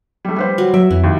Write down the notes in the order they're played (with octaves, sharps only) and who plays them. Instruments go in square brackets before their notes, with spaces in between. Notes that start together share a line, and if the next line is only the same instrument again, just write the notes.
[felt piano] G3 A3
G3 B4 C5
[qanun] F#3
[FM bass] F#3 [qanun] E5 [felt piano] D7
[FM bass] F2 [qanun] E3
[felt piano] D#2